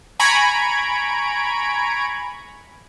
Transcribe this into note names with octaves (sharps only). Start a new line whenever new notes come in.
G#5 A#5 B5 C#6 G#6 D7